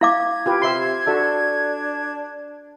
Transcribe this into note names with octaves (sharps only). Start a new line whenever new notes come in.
E4 F5 D6 G#6
F4 G4 B4
C3 E5 C6
D4 F#4 A4 E5